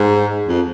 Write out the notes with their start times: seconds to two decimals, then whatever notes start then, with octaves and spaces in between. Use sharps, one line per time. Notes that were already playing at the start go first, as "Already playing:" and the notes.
Already playing: G#2
0.48 F2